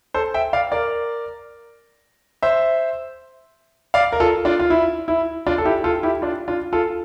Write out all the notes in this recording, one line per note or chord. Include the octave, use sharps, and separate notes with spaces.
A4 C5
E5 G5
D5 F5
A#4 D5
C5 E5
D5 F5
A#4
F4 A4
D4 F4
F4
E4
E4
D4 F4
A4
E4 G4
F4 A4
E4 G4
D4 F4
D4 F4
F4 A4